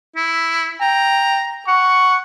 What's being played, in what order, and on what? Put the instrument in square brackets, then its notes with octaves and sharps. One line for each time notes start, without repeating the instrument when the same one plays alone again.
[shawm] E4
[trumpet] G5 [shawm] A#5
[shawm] F#5 [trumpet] C#6